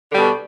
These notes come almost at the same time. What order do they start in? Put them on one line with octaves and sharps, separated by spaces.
D3 G3 B2